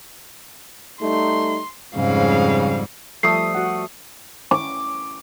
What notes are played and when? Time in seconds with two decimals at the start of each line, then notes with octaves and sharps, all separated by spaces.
1.01 G3 A3 D#4 C6
1.96 F2 G#2 C#3 G3 F5
3.23 F3 G3 A3 A4 D#6 C7
3.54 F#4 F#5
4.51 D6